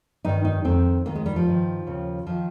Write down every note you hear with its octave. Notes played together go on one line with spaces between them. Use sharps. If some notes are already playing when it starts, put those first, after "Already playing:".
G2 D#3 D#4
D#4
F2 D#3 C4
D#2 D#3 A#3
G#3
G3
F3
G2 D#3
D#2 C#3
D#3 F3